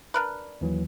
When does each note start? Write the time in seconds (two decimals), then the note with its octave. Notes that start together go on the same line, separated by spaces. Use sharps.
0.14 D4 A#4 B4
0.61 D#2 E3 F#3